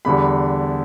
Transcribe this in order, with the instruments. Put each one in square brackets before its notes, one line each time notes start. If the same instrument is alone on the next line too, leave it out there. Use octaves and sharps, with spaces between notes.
[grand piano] E2 D3 G3 B5